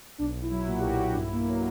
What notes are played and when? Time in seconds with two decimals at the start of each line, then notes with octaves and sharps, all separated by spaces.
0.18 B1 D4
0.35 B1
0.42 E4
0.51 F#3
0.67 A#2 F#4
0.79 G4
0.83 B1
0.91 F#4
1.00 B1
1.11 D4
1.15 G2 E4
1.32 A#3
1.48 F#3